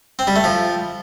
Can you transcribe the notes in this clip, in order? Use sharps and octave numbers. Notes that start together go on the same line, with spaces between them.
C4
G3
A3
F3